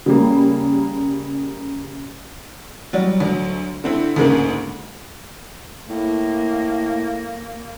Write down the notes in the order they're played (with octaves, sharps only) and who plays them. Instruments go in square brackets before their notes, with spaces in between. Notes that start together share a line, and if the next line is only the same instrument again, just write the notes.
[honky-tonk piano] C#3 G3 A#3
F#3 G3
D2 F#3
D3 C4 E4
D2 G#2 C#3 G#3 A#3
[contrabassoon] A2 [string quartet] A#3